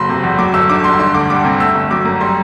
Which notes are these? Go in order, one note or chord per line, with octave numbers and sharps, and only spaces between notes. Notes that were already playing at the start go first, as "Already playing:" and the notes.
Already playing: F#1 F#3 B5 C6
C3
E2
F#3 D6
G1 E6
D3 D6
G2 C6
D4 C6
D2 D6
G3 D6
C3
A3 E6
G1
F#3 D6
F#2
G3 C6